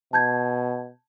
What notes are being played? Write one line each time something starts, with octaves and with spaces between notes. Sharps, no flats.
B2 A5 G6 G#6